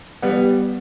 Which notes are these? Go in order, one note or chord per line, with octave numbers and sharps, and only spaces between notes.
G3 B3